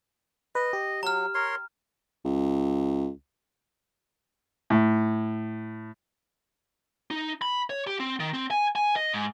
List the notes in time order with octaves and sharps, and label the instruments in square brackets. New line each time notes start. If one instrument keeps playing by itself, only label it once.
[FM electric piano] B4 [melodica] D#5
[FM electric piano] G4
[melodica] F#3 [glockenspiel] A#5 F6
[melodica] A#4 C#5 C6
[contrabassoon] C#2
[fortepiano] A2
[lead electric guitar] D#4
B5
C#5
G4
C4
D#3
C4
G#5
G#5
D#5
G#2